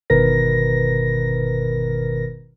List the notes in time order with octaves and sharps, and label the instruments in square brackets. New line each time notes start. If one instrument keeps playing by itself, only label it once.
[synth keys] G1 B2 D#3 A#4 B4 A#6